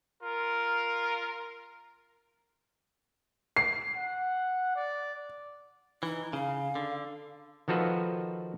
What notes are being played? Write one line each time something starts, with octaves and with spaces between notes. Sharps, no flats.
F4 A#4
C7
F#5
D5
E3 D#4
C#3 F5
D3
D#3 F3 F#4 A4 B4